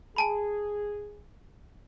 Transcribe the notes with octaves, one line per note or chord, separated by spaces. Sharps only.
G#4 G#5 A5 B5